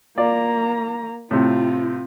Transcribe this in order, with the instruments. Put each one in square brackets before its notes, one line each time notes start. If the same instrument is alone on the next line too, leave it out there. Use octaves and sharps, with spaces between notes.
[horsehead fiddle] A#3 A#5 [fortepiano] F4 D5
[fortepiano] A2 C3 [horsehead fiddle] C4 F4